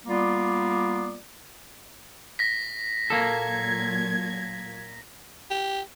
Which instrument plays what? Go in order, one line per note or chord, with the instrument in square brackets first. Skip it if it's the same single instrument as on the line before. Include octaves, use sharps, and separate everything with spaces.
[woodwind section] G3 A#3 B3 F4 D5
[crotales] A#6 B6
[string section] A#2 F#3 G#6 [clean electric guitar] A#3 A4
[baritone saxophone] G4